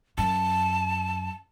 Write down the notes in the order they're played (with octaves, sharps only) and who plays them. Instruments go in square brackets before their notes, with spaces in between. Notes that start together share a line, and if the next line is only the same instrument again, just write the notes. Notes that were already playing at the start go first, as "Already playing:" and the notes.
[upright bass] F#2 [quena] A5